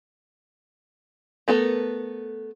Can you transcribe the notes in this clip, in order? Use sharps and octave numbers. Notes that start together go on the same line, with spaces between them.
A3 B3 A4 A#4